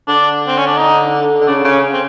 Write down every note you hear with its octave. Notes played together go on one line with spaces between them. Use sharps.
D3 D4
C4
C#4
D4
D#4
D3
C#3 D4
C#3
C#4
C4